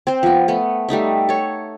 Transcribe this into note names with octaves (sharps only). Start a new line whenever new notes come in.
C4 C5
F3 B3
A3 B3
G3 A3 D#4 E5
A4 C#5